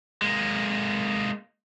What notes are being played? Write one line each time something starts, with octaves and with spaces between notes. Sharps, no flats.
G#3 A#3